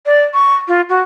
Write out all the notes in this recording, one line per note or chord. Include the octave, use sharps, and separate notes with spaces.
D5
C#6
F4
F#4